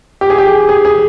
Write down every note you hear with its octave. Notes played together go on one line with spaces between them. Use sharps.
G4
G#4
G4
G#4
G#4